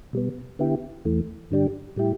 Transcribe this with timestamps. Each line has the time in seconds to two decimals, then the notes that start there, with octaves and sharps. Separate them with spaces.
0.13 B2 G3 B3
0.59 D3 B3 E4 G4
1.05 E2 E3 A3
1.51 G2 D3 G3 D4 G4
1.96 A2 G3 E4 G4